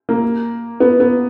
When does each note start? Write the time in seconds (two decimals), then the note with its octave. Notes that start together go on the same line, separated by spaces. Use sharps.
0.09 A#3
0.80 B3
1.00 B3